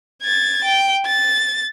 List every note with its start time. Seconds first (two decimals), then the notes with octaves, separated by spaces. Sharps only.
0.22 G#6 A6
0.64 G5
1.06 A6